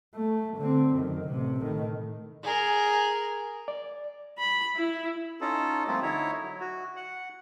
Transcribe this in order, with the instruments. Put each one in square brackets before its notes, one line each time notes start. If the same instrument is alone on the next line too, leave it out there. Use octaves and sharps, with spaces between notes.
[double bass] A3
D3 C4
F#2 D#3
A1 C3
A2 D#3
[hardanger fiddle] G#4 A#4
[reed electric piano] D5
[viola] B5
E4
[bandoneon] C#4 D#4 F4 A4
F3 G3 A3 A#3 C4 F4
D3 D#4 E4 C#5
F#3
F#4
F#5